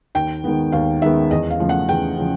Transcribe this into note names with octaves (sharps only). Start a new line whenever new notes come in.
D#2 G5
D#3 G#3 B3
D#2 F5
D#3 G#3 B3 E5
E2 D#5
F5
C#3 F3 A3
F#5
E2 G5
C#3 F3